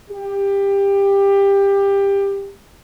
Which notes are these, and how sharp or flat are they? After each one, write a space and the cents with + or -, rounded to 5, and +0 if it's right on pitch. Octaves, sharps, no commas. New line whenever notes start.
G4 +20